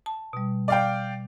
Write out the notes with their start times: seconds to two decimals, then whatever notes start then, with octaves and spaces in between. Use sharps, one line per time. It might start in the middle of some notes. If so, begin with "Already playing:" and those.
0.06 A5
0.33 B2 G3
0.68 D5 F5 G5